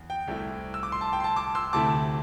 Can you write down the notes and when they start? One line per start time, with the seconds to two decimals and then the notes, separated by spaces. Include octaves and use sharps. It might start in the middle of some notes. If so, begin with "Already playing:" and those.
Already playing: E2
0.10 G5
0.28 C2 C3 A3 E4
0.74 E6
0.83 D6
0.92 C6
1.01 A5
1.13 G5
1.20 C6
1.24 A5
1.36 A5 D6
1.55 C6 E6
1.73 D2 C3 A3 E4 A5 D6